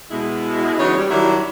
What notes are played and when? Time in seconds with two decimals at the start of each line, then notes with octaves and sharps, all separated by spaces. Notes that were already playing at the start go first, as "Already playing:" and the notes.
0.11 B2 G#3 E4
0.79 C#3 E3 F#3 G#3 D#4 C#5
0.97 G3
1.10 D#3 F#3 G3 D4 E4